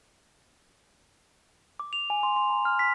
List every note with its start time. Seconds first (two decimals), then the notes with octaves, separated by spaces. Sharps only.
1.80 D6
1.93 F7
2.10 G#5
2.23 C6
2.36 C6
2.50 A#5
2.65 F6
2.79 B6